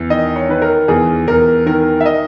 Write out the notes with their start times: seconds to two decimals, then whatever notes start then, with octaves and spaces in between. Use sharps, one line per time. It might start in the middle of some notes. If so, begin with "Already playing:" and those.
Already playing: E2
0.10 D#3 D#5
0.36 C#5
0.49 D#3 B4
0.62 A#4
0.88 E2 G#4
1.28 E2 A#4
1.66 D#3 A#4
2.01 E5
2.06 D#5